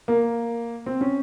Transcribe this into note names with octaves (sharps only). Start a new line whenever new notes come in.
A#3
C4
C#4